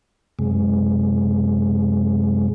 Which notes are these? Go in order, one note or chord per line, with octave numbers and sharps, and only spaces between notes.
F#2 C3 G#3